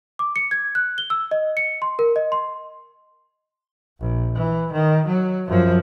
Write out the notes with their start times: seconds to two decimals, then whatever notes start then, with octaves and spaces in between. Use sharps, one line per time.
0.19 D6
0.36 C#7
0.51 G#6
0.75 F#6
0.98 G7
1.10 E6
1.31 D#5
1.57 C#7
1.82 C6
1.99 A#4
2.16 D#5
2.32 C6
3.99 A#1
4.35 E3
4.73 D#3
5.07 F#3
5.48 F#2 F3